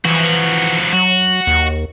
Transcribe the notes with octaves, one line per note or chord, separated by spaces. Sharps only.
E3 F3 F#4
F#3 F#4
D#2